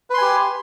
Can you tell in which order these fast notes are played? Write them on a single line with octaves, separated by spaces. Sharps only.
B4 C6 G#5 G4